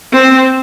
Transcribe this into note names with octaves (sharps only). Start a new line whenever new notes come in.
C4